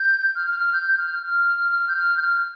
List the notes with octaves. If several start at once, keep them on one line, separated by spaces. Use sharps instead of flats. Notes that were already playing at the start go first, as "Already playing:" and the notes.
Already playing: G6
F6
F6
F6
G6
G6
F6
F6
F6
G6
F6
G6
F6